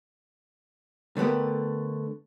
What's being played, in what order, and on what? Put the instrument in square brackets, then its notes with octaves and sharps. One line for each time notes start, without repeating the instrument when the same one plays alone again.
[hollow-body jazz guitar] D3 A3 B3 G4 A#4